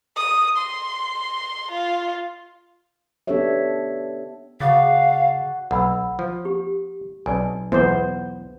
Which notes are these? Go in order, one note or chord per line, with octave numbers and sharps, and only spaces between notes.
D#6
C6
F4
B3 D4 G4 A4 C#5 E5
C#3 F#4 D5 F5
B1 F#5 B5 E6
F3
G4
B1 D#4 D5 G#5
B1 E2 B3 C5